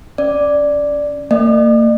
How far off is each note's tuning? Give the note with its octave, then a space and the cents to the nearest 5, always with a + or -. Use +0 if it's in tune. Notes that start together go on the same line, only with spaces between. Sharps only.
C#4 -5 D5 +0
A#3 -35 D5 +45